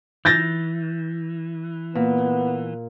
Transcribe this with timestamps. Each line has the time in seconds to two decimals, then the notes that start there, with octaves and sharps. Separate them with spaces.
0.25 E3 E6 G6 A6 A#6
1.95 A#2 B3